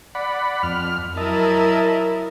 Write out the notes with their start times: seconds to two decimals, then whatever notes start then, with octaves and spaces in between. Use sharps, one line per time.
0.15 D5 F#5 B5
0.63 F2 F6
1.17 F#3 E4 A#4 D#5 E5 A5